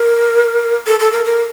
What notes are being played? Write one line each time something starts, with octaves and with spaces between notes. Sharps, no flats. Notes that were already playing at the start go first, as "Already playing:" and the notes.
Already playing: A#4
A4
A4
A#4
A#4